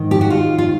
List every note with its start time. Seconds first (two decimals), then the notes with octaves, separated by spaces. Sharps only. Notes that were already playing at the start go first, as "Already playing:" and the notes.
Already playing: G#2 D#3
0.11 G4
0.21 F#4
0.30 F4
0.58 F4